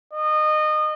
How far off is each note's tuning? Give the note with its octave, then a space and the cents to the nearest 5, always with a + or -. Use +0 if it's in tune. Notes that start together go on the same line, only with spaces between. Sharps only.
D#5 -25